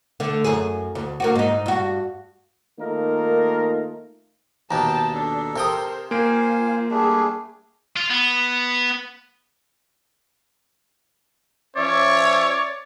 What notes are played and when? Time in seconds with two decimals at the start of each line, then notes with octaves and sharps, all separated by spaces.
0.20 D3 A3
0.44 F#2 G#4
0.95 D2
1.20 A#3 D4 F#4
1.35 G#2 D#4
1.66 G2 F#4
2.79 D#3 A3 A#3 D#4 F4 A#4
4.71 D#2 B2 G5 A5 A#5
5.15 D4 A4
5.56 C3 A#4 C5 G5 D#6
6.11 A#3 F4 C5 F5 G#5 D7
6.91 G3 A3 D4 G#4
7.96 F4
8.10 B3
11.76 F3 C#4 C#5 D5 E5